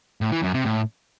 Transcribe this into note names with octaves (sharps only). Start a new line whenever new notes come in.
A2
E3
F#2
C3
A2